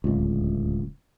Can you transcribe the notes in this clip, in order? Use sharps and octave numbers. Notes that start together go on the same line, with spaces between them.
D1 C#2